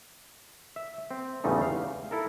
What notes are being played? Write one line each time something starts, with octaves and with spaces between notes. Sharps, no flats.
E5
C4
E2 G#2 C#3 G3 A3 D#4
F5
E4 A4 A#4